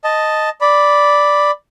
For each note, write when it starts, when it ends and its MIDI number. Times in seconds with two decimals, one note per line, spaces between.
0.04 0.49 75
0.04 0.49 81
0.61 1.51 74
0.61 1.51 83